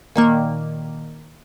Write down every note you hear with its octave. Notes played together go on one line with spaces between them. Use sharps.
A#2 D#3 A#3